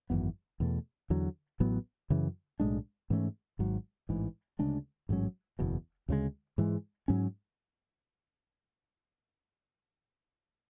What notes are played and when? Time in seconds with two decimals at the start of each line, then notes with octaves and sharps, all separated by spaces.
0.10 G#1 F#2 E3 B3
0.60 E2 B2 A3
1.10 E2 D3 F#3
1.60 A1 A2 F#3 B3
2.10 F#2 C#3 E3
2.60 B1 A2 G#3 D4
3.10 G#2 E3 A3 C#4
3.59 G#1 G#2 F#3
4.09 A1 G#2 E3
4.59 D2 C#3 G#3 D4
5.09 A1 G#2 F#3 C#4
5.59 F#1 E2 B2
6.08 D2 C#3 E3 G#3
6.58 G#2 E3 G#3
7.08 G#2 F#3 C#4